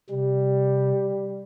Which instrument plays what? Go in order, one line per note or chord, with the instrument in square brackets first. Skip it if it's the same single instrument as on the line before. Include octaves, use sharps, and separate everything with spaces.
[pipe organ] C3 [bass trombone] G3